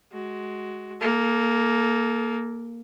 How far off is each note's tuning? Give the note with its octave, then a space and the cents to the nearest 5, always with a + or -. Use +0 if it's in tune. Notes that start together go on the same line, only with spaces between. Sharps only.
G#3 +15 F#4 +10
A#3 +0 A4 -35